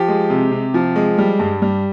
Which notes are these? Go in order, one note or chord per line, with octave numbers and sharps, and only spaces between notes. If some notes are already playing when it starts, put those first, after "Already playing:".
Already playing: F3 G4
G#3
C3
C3
F3
G#3
G3
G2
G3